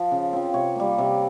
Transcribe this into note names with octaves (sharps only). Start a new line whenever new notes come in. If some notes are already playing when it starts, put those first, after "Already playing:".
Already playing: F3
C#3
F3 C4
C3 C#5
G3 A#3
C3